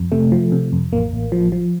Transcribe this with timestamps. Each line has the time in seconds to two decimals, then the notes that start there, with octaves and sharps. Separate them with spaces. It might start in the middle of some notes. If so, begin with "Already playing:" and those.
Already playing: F2
0.12 C3 A3
0.32 F3
0.52 C3
0.72 F2
0.92 A1 A#3
1.13 A1
1.32 F3
1.52 F3